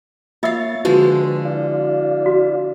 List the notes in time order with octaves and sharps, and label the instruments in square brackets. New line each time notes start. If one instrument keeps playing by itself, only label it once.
[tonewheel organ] A#3 A6 [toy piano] F4 E5 E6 [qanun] C#5 F5
[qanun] D3 F3 G#3 [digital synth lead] F#4 [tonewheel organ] B4
[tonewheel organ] E4 D5 F5
[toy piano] F#4